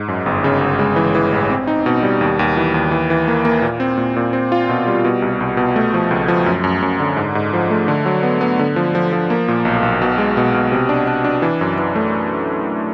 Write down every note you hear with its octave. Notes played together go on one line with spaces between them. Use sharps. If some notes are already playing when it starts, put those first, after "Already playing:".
Already playing: G#2
F#2
G1
C#3
G1
G#3
E3
E3
A1
C4
D#4
B2
G3
D#2
D#2
E3
D#2
E3
E3
A#3
A#3
A#2
C4
A#2
A#2
C4
F4
B2
G3
B2
C2
C2
B2
A3
F3
C#2
F3
F#2
F#2
F#2
D3
G#2
G#2
F3
A3
D3
F#3
B3
B3
D3
F3
F3
F3
A#3
A#2
B1
B1
B2
G#3
B2
B2
C3
D4
D4
D4
E3
F#2
E3
A3